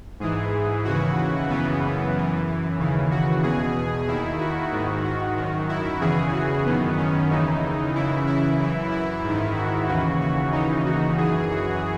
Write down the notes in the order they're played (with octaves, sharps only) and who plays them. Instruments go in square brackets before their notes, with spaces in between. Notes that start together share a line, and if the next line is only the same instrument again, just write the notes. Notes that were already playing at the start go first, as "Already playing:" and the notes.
[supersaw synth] G#2 E3 G#4
D#2 C#3 E3 F#4
F#2 C#3 E3 B3
F#2 E3
D#2 C#3 E3
F#4
E2 B2 G#4
D#2 D#3 E4
F#4
G#2 D#3
F#4
F#2 D#3
E4
E2 C#3 E3 G#4
F#4
F#2 D#3 B3
C#4
D#2 C#3 E3 D#4
F#2 C#3 E3 E4
E4
F#2 E3
E4
G#2 D#3
F#4
D#2 C#3 E3 F#4
F#4
D#2 C#3 E3 D#4
F#4
F#2 E3 G#4
F#4